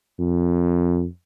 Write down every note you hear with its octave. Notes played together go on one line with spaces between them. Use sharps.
F2